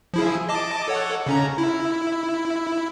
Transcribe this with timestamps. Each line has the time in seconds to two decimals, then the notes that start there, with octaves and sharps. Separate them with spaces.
0.14 F3 E4 G#4
0.49 D#5 A5 D6
0.88 A4 C#5 F#5
1.26 C#3 C#4 A#5
1.58 E4